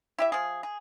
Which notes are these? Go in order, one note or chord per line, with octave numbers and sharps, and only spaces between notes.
E4 G4 E5
F3 G#4
G#4